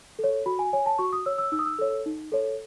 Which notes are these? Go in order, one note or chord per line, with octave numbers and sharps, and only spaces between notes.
A4 C#5
F#4 B5
G#5
C#5 G#5
A5
F#4 C#6
D#6
C#5 E6
E6
D#4 E6
D#6
E6
A4 C#5
D#4
A4 C#5